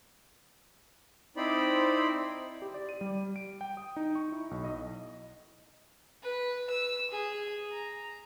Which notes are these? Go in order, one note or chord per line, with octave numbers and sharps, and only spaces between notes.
C4 D#4 E4 C5 D5 B5
G4
D5
D#7
G3
D7
G5
D#6
D#4
C#6
E4
B1
D#5
B4
E6
G#4
A#5